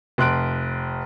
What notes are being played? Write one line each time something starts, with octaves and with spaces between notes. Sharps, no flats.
F1 C6 F#6 D7